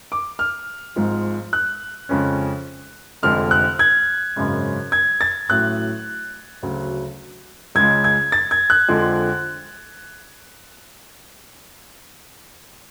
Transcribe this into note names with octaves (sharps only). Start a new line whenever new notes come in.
D6
F6
G#1 G#2 F3 G#3
F#6
F2 C#3 G#3 C#4
F1 F2 D3 G#3 F6
F#6
G#6
G#1 F#2 C#3 G#3
G#6
A6
A1 A2 F#3 F#6
D2 C#3 F#3
C#2 C#3 G#3 G#6
G#6
A6
G#6
F#6
F2 D3 F3 G#3